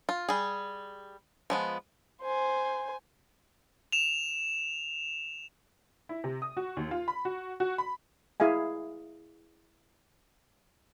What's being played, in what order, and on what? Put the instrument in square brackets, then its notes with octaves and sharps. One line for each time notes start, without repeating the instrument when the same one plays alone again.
[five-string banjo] F4
G3 G#4
F3 G#3 B3
[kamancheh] C5 G#5
[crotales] E7 F7
[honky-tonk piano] E4
C3
D#6
F#4
D#2
F4
B5
F#4
F#4
B5
[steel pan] E4 G#4 E5 F5 G#5